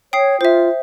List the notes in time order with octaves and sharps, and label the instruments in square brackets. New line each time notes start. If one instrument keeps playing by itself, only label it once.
[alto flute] C#5 [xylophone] G5 D#6 C7
[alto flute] F4 [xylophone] C5 E5